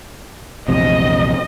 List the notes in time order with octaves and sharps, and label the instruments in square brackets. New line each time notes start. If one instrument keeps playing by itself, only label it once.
[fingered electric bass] A#1 E2 C3 [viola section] D#5